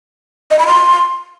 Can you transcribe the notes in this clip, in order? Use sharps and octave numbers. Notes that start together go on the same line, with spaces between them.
D#5
B5
C6